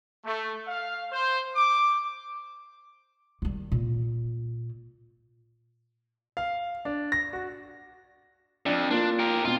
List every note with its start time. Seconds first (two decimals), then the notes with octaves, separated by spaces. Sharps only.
0.24 A3
0.68 F5
1.11 C5
1.55 D6
3.42 D#3 G3
3.72 A#2
6.37 F5
6.85 D4
7.12 A#6
7.33 F#4
8.66 F2 D4
8.91 A#3 D4 F4
9.19 G4 A#4
9.45 B2 C4 F4